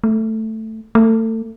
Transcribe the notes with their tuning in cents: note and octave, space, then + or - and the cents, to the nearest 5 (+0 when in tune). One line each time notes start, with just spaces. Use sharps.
A3 +5
A3 +30